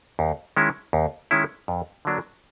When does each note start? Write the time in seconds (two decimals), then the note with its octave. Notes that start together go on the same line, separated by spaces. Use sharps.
0.19 D#2
0.56 D#3 G#3 C#4 E4
0.93 D#2
1.31 D#3 G#3 C#4 E4
1.68 F2
2.05 D3 F#3 A#3 D4